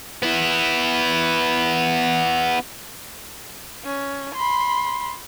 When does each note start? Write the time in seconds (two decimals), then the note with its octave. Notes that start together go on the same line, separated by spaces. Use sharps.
0.23 B3 E4
3.85 C#4
4.35 B5 C6